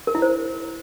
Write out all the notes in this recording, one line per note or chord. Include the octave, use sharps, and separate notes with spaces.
A#4
E4
C5